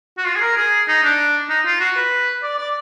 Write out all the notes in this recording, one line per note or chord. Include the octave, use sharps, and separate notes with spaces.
F#4
F4
G#4
A#4
G#4
D#4
D4
D#4
F4
F#4
B4
D5
D5